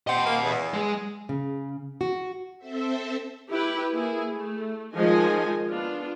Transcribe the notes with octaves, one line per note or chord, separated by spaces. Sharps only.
C4 G4 D#5 F#5
A#3
E2
G#3 G#4
C#3
F#4
C4 A4 C5 E5
E4 G4 B4
A#3 E4 G#4
A3
D#3 F3 G#3 D#5 G#5
B3 D4 F4